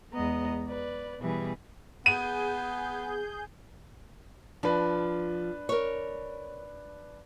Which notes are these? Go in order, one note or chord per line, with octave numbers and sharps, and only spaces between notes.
E2 G#3 B3 D#5 A#5
B4 D5
B2 E3 G3 G#4 B4
B3 G#4 G6 D#7
F3 D4 B4
A#4 C#5